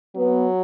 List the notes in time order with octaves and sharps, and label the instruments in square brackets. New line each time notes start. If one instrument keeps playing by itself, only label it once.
[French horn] F#3 [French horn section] B3